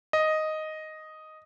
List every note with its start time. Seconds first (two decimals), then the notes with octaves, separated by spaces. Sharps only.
0.13 D#5